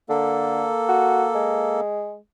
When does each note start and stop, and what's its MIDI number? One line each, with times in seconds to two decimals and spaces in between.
0.09 0.65 50
0.09 1.80 58
0.09 1.80 69
0.89 1.26 66
1.35 2.16 56